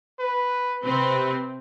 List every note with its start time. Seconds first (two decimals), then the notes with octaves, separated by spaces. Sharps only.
0.20 B4
0.84 C3 C4 B4